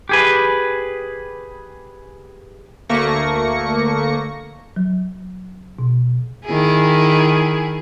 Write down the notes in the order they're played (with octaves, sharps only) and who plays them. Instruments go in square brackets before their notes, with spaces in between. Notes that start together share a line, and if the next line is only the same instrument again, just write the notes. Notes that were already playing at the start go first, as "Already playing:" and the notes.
[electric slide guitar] G4 G#4 B4
[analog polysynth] D2 A3 A#3 C#6 A#6 C#7
[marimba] F#3
B2
[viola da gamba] D#3 E4 G#4